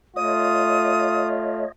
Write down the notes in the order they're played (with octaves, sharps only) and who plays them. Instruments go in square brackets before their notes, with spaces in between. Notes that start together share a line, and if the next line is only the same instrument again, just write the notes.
[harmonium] A3 [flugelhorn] F4 [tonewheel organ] C#5 D#5 [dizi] D#6